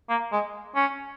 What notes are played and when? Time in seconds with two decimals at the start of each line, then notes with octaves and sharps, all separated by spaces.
0.09 A#3
0.32 G#3
0.76 C#4